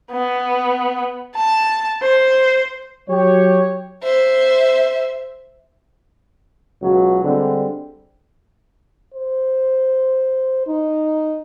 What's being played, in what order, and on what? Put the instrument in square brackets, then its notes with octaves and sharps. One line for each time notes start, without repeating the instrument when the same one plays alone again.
[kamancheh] B3
A5
C5
[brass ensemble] F#3 G4 C#5
[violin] C5 E5
[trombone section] C#2 B2 F#3
D3 G3 G#3 C4
[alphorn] C5
D#4